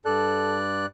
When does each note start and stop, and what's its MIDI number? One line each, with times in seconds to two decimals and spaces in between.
0.05 0.86 43
0.05 0.61 69
0.05 0.86 74
0.05 0.86 90